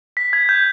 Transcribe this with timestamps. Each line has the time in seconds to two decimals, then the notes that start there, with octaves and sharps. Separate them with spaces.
0.17 B6
0.33 G#6
0.49 G6